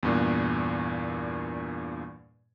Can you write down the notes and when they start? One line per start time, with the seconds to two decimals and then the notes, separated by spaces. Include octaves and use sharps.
0.03 E2 G2 A#2